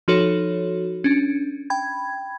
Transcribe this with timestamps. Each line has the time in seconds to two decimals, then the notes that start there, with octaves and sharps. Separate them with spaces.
0.08 F3 D#4 F#4 A4 C#5
1.04 C#4 D4
1.70 G5 B5 G#6